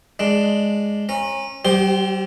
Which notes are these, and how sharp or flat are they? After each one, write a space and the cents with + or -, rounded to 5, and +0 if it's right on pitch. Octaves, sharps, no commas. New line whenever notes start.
G#3 +0 D4 +0
C#4 -30 A#5 +0
G3 -45 G4 +0 C5 +0